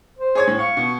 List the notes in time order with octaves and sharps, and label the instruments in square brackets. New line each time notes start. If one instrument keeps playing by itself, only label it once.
[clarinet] C5
[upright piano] G#4 C#5 G#6
A2
[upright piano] F5 [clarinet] C#6
[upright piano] B2